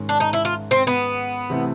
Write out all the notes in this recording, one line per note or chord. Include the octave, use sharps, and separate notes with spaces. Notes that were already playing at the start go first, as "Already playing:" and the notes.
Already playing: G#2 D#3 G#3 C#4
D4
D#4
E4
F4
C4
B3
C3 E3 A3 C4 E4